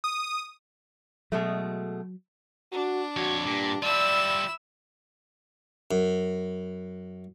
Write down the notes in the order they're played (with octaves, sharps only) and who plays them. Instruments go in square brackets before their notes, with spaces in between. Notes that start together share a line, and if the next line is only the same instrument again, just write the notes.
[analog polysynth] D#6
[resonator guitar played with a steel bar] B2 G#3 A3 [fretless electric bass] F#3
[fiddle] D4 [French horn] F#4
[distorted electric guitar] F2 C#5 [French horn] F#4
[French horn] G2 [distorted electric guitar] A#2
[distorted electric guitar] G3 F4 [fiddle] E4 E6 [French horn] D5
[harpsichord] F#2